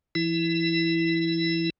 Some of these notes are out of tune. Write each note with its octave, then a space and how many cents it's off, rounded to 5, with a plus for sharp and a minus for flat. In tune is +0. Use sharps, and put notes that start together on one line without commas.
E3 +35 E4 +0